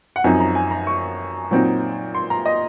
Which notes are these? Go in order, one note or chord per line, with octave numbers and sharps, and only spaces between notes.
F#5
F#2 F3 C4 D#4 G#5
A#5
G#5
A#5
C#6
A#2 F#3 C4 D#4
C6
A#5
D#5